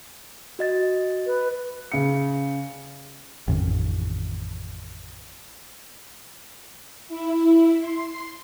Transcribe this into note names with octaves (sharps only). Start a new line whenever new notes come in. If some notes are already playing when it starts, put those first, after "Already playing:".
F#4 D#5 A6
B4
C#3 C#7
A1 F2 C3 D#3
E4
C6